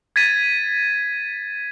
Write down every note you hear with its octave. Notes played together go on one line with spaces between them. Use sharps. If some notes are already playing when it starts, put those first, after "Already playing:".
G#6 A6 B6 D#7